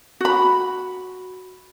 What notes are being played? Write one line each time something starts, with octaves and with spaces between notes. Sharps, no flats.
F#4 B5